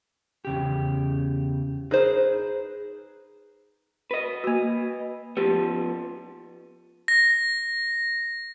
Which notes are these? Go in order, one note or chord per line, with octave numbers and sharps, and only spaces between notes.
E2 C#3 G4
D#4 G#4 B4 C5
B4 D#5
A#3 F#4
F3 B3 G4
A#6